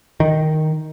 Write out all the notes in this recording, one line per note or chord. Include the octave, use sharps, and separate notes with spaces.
D#3